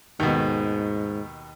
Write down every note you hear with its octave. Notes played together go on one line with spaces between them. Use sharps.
D#2 G#2 B2